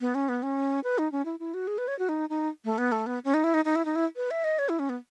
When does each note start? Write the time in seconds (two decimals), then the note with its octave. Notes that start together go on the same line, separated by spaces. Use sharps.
0.01 B3
0.15 C#4
0.29 B3
0.43 C#4
0.84 B4
0.98 D#4
1.12 C#4
1.25 E4
1.39 E4
1.54 F#4
1.67 G#4
1.78 B4
1.88 C#5
1.99 F#4
2.09 D#4
2.29 D#4
2.65 A3
2.78 B3
2.92 A3
3.06 B3
3.24 C#4
3.34 D#4
3.44 E4
3.54 D#4
3.65 D#4
3.75 E4
3.85 D#4
3.95 E4
4.16 B4
4.31 E5
4.44 D#5
4.59 C#5
4.69 E4
4.79 C#4
4.89 B3